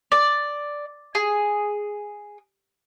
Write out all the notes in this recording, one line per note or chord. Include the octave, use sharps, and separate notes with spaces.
D5
G#4